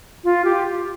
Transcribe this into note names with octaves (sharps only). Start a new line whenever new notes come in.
F4
G4